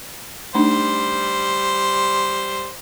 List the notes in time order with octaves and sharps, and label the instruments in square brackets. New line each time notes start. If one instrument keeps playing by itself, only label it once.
[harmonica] G3 C5 [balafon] A3 D4 D#4